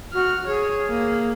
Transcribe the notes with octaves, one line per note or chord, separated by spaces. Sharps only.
F#4 F6
G#4 C#5
A#3